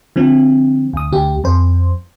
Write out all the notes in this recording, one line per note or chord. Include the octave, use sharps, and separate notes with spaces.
D3 F3 C4
D2 D#6
D2 G4
F2 C5